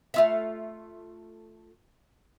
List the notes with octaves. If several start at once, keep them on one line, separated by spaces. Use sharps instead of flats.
A3 F4 E5